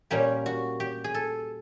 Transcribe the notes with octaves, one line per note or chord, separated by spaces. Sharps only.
A#2 G3 A#3 C#4 G4
F#4
G4
G#4
A4